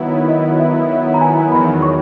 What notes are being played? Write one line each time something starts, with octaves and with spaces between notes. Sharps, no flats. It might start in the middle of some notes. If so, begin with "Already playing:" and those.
Already playing: D#3 F#3 B3 E4
D#5
E5
A#5
G#5
E2 D#3 F#3 B5
C#6